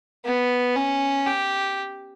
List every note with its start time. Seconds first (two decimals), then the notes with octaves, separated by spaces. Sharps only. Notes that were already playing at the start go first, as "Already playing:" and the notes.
0.25 B3
0.76 C#4
1.26 G4